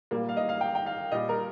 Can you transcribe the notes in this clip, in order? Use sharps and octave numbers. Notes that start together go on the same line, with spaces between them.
A#2 G3 A#3
F5
D#5
F5
G5
G5
F5
A#2 G3 D#5
A#4